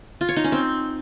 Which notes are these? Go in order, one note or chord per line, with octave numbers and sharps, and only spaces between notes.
F4
C#5
D#4
C#4
C4